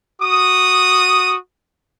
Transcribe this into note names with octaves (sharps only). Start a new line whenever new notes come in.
F#4 D#6